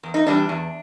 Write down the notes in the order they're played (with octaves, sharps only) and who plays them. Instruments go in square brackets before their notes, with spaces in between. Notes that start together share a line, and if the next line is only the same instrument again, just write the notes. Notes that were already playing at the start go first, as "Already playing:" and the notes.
[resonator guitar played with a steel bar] E2
D#4
C3 E3 G3 D4
E2